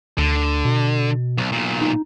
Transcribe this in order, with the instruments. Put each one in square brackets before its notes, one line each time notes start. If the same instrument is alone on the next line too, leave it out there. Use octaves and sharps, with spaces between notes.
[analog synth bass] D2 [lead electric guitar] D3
[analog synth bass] B2
[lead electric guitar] B1
B1 A#2
[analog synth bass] D#4